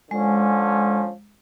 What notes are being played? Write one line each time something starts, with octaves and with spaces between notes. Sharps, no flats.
D3 F3 G#3 C#4